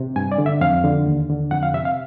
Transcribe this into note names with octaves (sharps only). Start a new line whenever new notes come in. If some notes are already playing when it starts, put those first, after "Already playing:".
Already playing: C3
G2 G#5
D5
D3
E5
F2 F5
D3
D#2
D3
F2 F#5
F5
C3 E5
F5